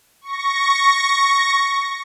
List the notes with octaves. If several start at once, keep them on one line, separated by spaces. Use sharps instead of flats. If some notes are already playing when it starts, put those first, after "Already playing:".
C#6 A#6